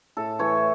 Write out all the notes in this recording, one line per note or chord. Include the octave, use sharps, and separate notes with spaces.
A2 A4
E3 A3 C#5